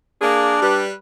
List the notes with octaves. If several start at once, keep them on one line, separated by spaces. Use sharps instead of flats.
A#3 D4 G#4
G3 B4